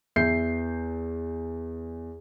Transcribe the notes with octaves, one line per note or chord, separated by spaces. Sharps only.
E2 E5 G6 C7